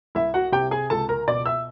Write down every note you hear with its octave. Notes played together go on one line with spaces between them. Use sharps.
C2 E4 E5
F#4 F#5
C3 G4 G5
G#4 G#5
C#2 A4 A5
A#4 A#5
B2 D5 D6
E5 E6